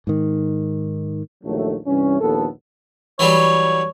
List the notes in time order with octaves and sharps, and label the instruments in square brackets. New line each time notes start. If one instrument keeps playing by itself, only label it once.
[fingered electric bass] G#2 D#3
[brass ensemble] A#1 D#2 D#3 F#3 A3
C2 G2 E3 C#4
A#1 D#2 B3 A4
[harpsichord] E3 F#3 G3 [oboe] C#5